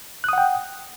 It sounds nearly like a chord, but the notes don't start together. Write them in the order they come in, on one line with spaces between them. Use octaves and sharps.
F#6 D#6 F#5 G5